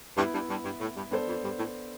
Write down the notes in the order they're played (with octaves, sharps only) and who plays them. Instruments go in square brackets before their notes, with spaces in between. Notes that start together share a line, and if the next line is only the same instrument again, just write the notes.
[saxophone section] G2 [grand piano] B3 E4 B4 E5
[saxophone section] G2
G2
G2
A2
G2
[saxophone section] G2 [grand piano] B3 D4 A4 C5
[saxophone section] F2
G2
A2